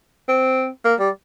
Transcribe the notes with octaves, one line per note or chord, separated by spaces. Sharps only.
C4
A#3
G3